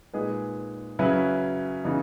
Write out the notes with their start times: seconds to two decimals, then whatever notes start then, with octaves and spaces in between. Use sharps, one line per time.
0.14 A#2 G#3 D#4 G#4 B4
0.99 C#3 F#3 C#4 E4 B4
1.85 C#3 E3 B3 D#4